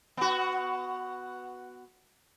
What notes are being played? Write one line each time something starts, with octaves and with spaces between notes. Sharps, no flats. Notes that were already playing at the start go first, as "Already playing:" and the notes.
B3 F#4